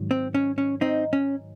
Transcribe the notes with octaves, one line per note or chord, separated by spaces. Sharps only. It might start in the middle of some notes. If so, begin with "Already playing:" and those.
Already playing: G#2 D#3 F#3
C4
C#4
C#4
C4 D#4
C#4